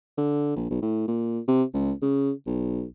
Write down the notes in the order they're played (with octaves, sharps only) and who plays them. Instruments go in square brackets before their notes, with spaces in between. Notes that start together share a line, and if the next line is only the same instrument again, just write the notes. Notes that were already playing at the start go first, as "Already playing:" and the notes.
[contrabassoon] D3
A#1
B1
A2
A#2
C3
C#2
C#3
B1